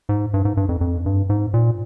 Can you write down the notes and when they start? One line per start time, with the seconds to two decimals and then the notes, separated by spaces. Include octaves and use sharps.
0.09 G#2
0.34 G2
0.45 G#2
0.57 G2
0.69 F2
0.81 F2
1.06 G2
1.29 G#2
1.54 A#2